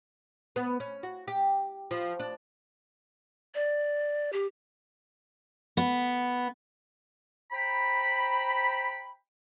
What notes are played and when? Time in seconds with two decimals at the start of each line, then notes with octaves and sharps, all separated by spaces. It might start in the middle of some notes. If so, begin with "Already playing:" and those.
0.56 B3
0.80 C#4
1.03 F#4
1.28 G4
1.91 F3
2.19 D4
3.55 D5
4.33 G4
5.77 B3
7.51 C5 G5 A#5 B5